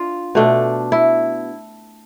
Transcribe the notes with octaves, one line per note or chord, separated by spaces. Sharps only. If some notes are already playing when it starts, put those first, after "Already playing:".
Already playing: D4 F4
B2 A3 D4
E4